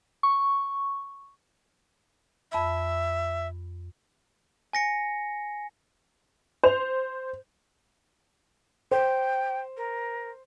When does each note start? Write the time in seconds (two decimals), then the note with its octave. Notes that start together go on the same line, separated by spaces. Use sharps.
0.23 C#6
2.52 F2 E5 B5 E6
4.73 G#5 A#6 C#7
6.63 C5 F7
8.91 C5 G5
9.77 A#4